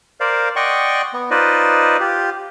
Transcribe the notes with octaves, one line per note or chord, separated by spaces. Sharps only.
A#4 C5 D5 F5
D5 D#5 F#5 G5 C6 C#6
B3
D#4 F4 B4 C5 D5 D#5
F4 G4